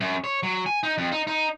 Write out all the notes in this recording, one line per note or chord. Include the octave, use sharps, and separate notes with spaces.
F#2
C#5
F#3
G#5
D#4
F2
D#4
D#4